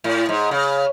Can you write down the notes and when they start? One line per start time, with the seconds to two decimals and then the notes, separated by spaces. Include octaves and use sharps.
0.04 A2
0.29 G#2
0.51 C#3